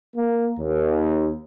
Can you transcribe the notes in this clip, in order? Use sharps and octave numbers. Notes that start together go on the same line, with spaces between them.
A#3
D#2